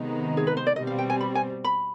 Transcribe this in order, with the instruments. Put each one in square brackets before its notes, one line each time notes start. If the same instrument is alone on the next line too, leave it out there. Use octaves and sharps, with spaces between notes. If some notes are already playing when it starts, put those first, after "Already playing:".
Already playing: [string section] C3 D#3 G#3 B3 D#4
[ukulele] G#4
B4
C5
D5
[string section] B2 G3 C4 [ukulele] D#5
[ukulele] F5
G5
G#5
B5
G#5
B5